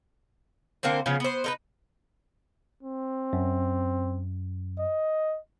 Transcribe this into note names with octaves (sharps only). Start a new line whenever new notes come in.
D3 A#3 C4 C5
C#3 F3 B3 C#4
B3 C5
D#4 A#4 B4
C4
F#2
D#5